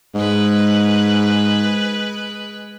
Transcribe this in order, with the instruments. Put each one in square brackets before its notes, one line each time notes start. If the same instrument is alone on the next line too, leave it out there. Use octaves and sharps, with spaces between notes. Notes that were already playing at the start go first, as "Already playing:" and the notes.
[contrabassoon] G#2 [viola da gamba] G#3 B4